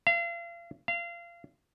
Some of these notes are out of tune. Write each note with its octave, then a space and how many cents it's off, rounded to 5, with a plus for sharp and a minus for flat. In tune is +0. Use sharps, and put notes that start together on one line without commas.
F5 -35
F5 -25